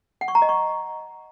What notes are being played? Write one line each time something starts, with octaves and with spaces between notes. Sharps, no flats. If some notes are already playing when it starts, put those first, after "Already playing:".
F#5
C#6
A#5
D#5
C#6